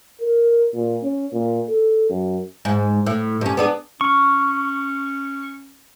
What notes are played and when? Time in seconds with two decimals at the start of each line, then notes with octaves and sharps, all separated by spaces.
0.21 A#4
0.74 A#2
1.03 C#4
1.32 A#2
1.69 A4
2.09 F#2
2.65 G#2
3.06 A2
3.41 G2 C#4
3.57 B3 D4 G#4
4.01 C#4 C#6